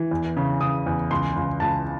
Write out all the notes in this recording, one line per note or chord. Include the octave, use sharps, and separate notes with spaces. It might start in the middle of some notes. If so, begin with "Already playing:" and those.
Already playing: E3
E2
C#3
C#3 D#6
E2
C#2 C6
C#2
C#2 A5